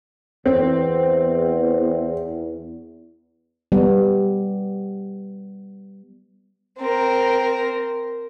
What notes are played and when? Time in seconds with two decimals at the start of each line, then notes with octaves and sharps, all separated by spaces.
0.46 E2 C4
3.72 G3 B3
6.79 C4 A#4